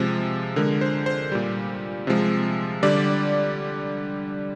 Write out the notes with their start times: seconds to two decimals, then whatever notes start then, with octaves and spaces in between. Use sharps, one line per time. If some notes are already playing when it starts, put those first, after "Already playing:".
Already playing: C3 F3 G#3
0.56 D3 G#3 A#4
0.81 C5
1.06 C5
1.32 A#2 G3
2.07 C3 F3 G#3
2.83 D3 G3 D5